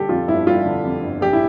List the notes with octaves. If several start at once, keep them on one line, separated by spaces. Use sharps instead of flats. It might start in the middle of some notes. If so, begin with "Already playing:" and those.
Already playing: D3 G3 G4 A4
F2 F4
G1 E4
G3 F4
D3
F2
G1
A#1 G4
E4